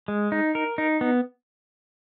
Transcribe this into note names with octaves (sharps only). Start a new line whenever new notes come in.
G#3
D#4
A#4
D#4
B3